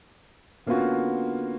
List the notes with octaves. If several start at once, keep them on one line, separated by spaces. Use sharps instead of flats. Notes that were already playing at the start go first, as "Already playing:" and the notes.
D3 A#3 B3 C#4 F4 F#4